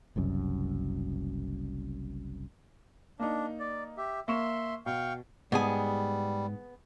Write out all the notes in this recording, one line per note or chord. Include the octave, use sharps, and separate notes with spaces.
F#1 C2 F#2
A#3 D4 D#4
D5
G4 E5
A#3 E5 C6 C#6 E7
B2 F5 G5 C#6
G#2 G3 B3 G#4 G#5